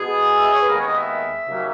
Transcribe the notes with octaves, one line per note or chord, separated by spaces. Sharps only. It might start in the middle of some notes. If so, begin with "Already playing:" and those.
Already playing: B2 G#3 B3 G#4
E5
D#5
C#5
B4
D#2 D#3 G#3 B3 A#4
C#5
D#5
E5
D#2 C#3 F#3 A#3